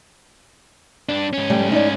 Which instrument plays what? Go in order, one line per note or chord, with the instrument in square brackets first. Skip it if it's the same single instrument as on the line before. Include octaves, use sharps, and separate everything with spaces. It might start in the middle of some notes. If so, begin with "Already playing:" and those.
[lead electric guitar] G2 D4
G#2 C#4
[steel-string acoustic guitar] G3 A3
D#4 E4 D5